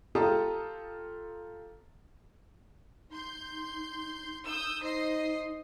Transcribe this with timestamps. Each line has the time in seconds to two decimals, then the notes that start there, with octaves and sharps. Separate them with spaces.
0.15 F4 G4 A4 A5 A#5 D#6
3.10 D#4 C6 G6
4.44 D#6 E6 G6
4.81 D#4 C5 D#5 C7